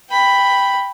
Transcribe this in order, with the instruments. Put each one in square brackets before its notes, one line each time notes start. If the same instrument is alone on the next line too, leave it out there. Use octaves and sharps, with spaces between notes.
[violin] G5 B5